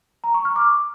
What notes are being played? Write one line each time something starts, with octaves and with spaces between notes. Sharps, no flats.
A#5
C#6
F6
D6